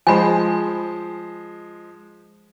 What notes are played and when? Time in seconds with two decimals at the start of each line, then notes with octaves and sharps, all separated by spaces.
0.07 F3 G#3 C5 G#5 B5